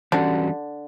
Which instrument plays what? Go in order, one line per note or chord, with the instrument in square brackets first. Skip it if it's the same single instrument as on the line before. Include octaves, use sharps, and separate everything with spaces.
[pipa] D3 [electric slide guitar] E3 G3 C#4 F#4